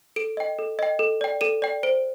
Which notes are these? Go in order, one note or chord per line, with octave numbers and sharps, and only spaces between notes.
A4 D7
D#5 G5
A4
D#5 G5
A4
D5 G5
A4 D#7
D5 G5
C5 D7